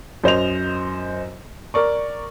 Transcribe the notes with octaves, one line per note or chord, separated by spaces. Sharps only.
F#2 C5 D#5 F7
A#4 D5 C#6